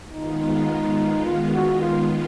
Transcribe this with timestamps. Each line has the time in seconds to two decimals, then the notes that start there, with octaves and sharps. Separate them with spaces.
0.13 D#3 G#3 B3 D#4 F4
1.25 F4
1.53 F#4
1.81 F4